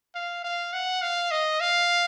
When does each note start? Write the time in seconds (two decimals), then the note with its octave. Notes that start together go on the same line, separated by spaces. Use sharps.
0.15 F5
0.44 F5
0.73 F#5
1.02 F5
1.31 D#5
1.60 F5